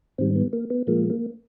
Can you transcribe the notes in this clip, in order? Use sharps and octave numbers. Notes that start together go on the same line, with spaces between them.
G#2 D#3 G3 C4
B3
A#3
B3
A#2 F3 G#3 A#3
A#3